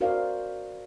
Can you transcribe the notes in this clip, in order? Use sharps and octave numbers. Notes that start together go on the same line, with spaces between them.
F#4 A#4 C5 D5 F5